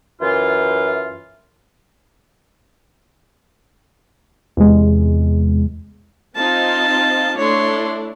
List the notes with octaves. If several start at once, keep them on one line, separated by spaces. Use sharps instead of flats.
F#2 E3 F4
E2 C3 G#3
C4 D#4 F4 A5
A3 D4 E4 C#5 C6